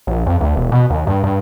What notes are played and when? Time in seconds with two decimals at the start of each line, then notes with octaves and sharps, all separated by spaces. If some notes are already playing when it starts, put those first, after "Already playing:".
0.07 A#1
0.26 F2
0.41 D2
0.56 E1
0.72 B2
0.90 D#2
1.07 G2
1.24 G2